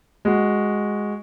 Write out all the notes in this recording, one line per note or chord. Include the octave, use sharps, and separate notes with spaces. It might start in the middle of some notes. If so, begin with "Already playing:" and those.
G#3 F#4